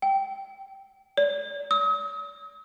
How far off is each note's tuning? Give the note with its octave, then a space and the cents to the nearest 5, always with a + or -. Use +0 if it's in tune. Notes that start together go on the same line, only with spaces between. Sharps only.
G5 -5
D5 -40
D#6 +40